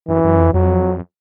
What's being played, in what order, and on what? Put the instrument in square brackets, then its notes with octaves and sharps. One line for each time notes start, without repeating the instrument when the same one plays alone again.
[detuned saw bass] F#2 [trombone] E3
[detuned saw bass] F#2
F2
[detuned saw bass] F2 [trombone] F#3